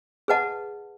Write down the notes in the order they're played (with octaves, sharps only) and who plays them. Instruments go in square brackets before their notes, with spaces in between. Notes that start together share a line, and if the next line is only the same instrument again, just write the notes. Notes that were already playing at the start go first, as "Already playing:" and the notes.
[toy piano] G#4 B4 D#5 F#5 A5